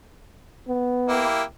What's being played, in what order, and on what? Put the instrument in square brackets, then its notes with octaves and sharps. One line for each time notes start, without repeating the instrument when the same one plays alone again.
[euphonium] B3
[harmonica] A#3 E4 G4